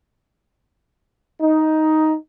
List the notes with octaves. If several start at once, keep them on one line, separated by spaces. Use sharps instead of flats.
D#4